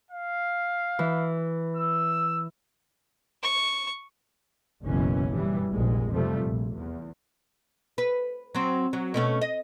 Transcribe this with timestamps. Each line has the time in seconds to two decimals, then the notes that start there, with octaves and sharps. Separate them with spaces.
0.11 F5
0.99 E3
1.76 E6
3.43 C#6
4.83 F#1 B1 F#2 B2 E3 C#4
5.30 G2 E3 G3
5.71 F1 A#1 G#3
6.11 F2 C3 F3 G3 A3
6.43 A#1
6.75 E2
7.98 B4
8.55 F#3 C4
8.93 F#3
9.14 B2 A3 C#4
9.41 D#5